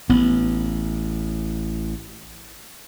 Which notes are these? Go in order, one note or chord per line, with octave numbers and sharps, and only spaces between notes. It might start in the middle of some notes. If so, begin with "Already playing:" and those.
A1 B3